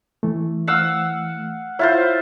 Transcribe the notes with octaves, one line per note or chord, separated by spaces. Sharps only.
E3 A3
F5 F#5 E6
E4 F4 C5 C#5